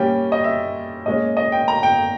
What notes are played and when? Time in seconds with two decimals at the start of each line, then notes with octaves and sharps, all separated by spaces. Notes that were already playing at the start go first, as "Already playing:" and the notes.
Already playing: A#2 G3 C#4 G5
0.32 D#5
0.44 E5
1.06 A#2 G#3 C#4 D#5
1.37 D#5
1.52 G5
1.68 A#5
1.83 G5